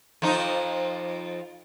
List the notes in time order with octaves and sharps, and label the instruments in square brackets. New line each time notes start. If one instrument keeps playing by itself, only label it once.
[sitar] F2 F3 D#4